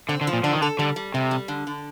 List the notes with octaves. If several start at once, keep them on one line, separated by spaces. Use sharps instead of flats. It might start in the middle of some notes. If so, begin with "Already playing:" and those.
D3 C4
D3
F3
A#2
D3 D4
D#3
D3 A4
D3 G3
G3
C3 G3
G3
D3
D3